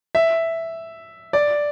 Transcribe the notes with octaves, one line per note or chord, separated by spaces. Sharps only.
E5
D5